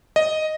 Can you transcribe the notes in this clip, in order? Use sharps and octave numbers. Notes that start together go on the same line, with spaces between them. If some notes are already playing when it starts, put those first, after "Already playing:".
D#5